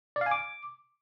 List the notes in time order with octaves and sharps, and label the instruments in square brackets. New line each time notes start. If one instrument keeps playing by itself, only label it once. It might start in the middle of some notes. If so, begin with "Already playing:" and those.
[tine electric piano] D5
F5
G#5
D6